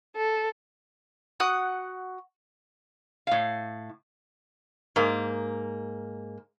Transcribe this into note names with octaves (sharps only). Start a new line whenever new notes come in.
A4
F#4 F#5 D#6
A2 F5
G#2 A#3